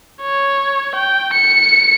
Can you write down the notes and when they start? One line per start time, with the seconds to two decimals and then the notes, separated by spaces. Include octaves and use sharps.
0.22 C#5
0.95 G5
1.33 C#7